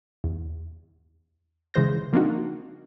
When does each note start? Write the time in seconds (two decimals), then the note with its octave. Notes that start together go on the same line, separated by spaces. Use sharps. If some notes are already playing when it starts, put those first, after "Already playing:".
0.24 E2
1.74 C#3 E3 G#3 C5 G6 A#6
2.13 F3 A#3 C4 D4 D#4 F#4